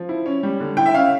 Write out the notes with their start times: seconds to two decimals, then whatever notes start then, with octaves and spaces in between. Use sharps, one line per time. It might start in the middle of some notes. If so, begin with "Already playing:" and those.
Already playing: F3
0.09 E4
0.26 C#4
0.43 G3
0.60 D3
0.77 E4 G5
0.86 E5
0.94 C#4 F5